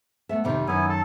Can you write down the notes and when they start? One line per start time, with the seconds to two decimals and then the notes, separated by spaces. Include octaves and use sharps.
0.29 A3 B3 E5
0.44 F2 C3 D#3 G3
0.67 F#2 D#3 B3 E4 G#5
0.89 A4 A5